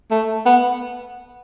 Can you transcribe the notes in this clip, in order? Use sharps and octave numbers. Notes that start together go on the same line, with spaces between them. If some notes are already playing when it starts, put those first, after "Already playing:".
A3
B3